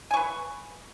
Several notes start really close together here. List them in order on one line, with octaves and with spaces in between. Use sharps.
G#5 C#6 B4